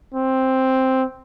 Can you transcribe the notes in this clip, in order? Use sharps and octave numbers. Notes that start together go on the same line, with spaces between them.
C4